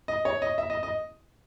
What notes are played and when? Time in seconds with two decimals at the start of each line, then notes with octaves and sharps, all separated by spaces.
0.08 D#5
0.25 C#5
0.42 D#5
0.58 E5
0.70 D#5
0.83 D#5